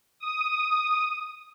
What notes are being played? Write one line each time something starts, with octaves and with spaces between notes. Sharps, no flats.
D#6